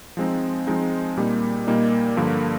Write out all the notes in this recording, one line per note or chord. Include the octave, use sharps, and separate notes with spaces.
F3 G#3 C4 D#4
F3 G#3 C4 D#4
A#2 G3 A#3 D#4
A#2 G3 A#3 D#4
G2 D3 F3 A#3